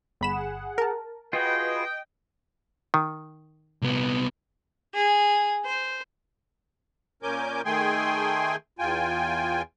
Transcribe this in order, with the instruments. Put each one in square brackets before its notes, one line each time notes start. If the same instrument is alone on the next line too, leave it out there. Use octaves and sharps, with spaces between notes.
[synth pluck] G1 B5 E7 [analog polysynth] G#4 F#5
[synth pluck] A#4 A5
[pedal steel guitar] F4 F#4 G#4 [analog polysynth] B4 [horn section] D#5 G5
[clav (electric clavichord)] D#3
[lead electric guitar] C2 B3
[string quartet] G#4
C5
[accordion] A#2 C#4 A#4 G#5 D6 G6
D#3 A3 G#4 G5 G#5 C6
E2 F4 G5 G#5